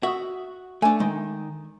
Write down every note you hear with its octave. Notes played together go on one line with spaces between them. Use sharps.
F#4 E5 C#6 D#6
A3 D4 G#5
D#3 G#3